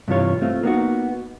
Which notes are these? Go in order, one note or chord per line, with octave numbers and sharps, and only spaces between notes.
G2 C3 E3 F4 C#5
A3 C4 F4
A#3 B3 D#4 F#4